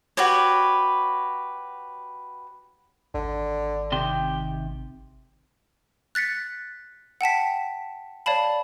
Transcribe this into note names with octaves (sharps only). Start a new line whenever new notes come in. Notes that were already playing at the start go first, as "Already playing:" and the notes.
F#4 G4 B4 C#5
G#1 D3
C3 D#3 G4 C6
F#6 A6 B6 C#7
F#5 G5 A5 B6
C#5 D5 F5 A5 B5